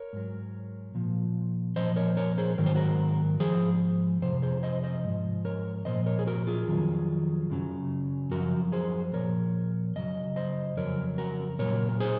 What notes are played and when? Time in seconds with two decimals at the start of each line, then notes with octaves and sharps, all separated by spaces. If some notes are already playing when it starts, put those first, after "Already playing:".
Already playing: A#4 C#5
0.13 G#2 F#3
0.95 A#2 F3
1.76 A#2 F3 C5 D#5
1.96 A#4 C#5
2.17 A#4 C#5
2.38 G#4 C5
2.58 G#2 D#3 F#3 A#4
2.66 C5
2.75 F#4 A#4
3.40 G#2 F3 G#4 C5
4.22 F2 C3 F3 C5
4.42 G#4 C5
4.63 C5 D#5
4.83 C5 D#5
5.04 G#2 F3
5.45 A#4 C#5
5.85 A#2 F3 C5 D#5
6.06 A#4 C#5
6.19 G#4
6.27 F#4 A#4
6.47 F4 G#4
6.68 F2 D#3 F#3
7.50 F#2 C#3 F#3
8.31 F#2 F3 F#4 A#4
8.72 G#4 C5
9.13 A#2 F3 A#4 C#5
9.95 F#2 C#3 F#3 D#5
10.36 C5 D#5
10.77 F2 C#3 F#3 A#4 C#5
11.18 F#4 A#4
11.59 A#2 F#3 A#4 C#5
11.89 A#4
12.00 G#4 C5